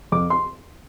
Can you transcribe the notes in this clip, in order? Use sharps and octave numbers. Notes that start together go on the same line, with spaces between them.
F2 D6
C6